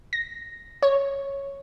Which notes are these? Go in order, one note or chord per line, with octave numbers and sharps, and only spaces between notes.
A#6
C#5